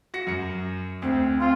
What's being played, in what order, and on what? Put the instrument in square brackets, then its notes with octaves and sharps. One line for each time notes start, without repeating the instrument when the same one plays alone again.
[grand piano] F#4 A#6 C#7
F#2 C#7
[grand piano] D2 [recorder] C4
[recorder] C4 [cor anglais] F4